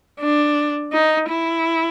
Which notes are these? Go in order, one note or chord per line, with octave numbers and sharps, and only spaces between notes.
D4
D#4
E4